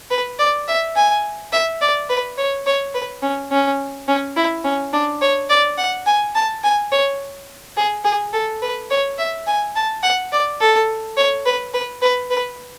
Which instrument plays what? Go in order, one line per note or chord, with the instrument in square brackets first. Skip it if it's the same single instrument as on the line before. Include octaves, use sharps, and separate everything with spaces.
[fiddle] B4
D5
E5
G#5
E5
D5
B4
C#5
C#5
B4
C#4
C#4
C#4
E4
C#4
D4
C#5
D5
F#5
G#5
A5
G#5
C#5
G#4
G#4
A4
B4
C#5
E5
G#5
A5
F#5
D5
A4
C#5
B4
B4
B4
B4